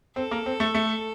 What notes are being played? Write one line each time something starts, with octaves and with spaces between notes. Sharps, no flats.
C4 A4
A#3
C4
A3
A3